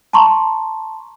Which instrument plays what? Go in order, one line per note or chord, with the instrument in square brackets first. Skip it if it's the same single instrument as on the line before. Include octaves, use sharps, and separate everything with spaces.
[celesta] A5 A#5 C6 C#6